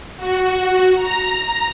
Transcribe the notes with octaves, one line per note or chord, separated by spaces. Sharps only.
F#4
A#5